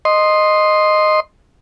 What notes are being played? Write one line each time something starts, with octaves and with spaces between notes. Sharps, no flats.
D#5 C6